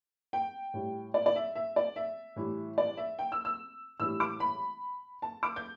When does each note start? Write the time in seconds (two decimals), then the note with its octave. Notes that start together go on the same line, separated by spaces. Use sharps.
0.33 G5
0.74 A2 G3
1.14 D5
1.26 D5
1.36 E5
1.55 E5
1.76 D5
1.96 E5
2.36 A2 E3 G3
2.78 D5
2.97 E5
3.19 G5
3.32 E6
3.45 E6
4.00 A2 E3 G3 E6
4.20 D6
4.40 B5
5.22 A5
5.43 D6
5.56 G6